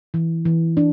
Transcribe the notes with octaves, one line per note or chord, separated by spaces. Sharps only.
E3
E3
D4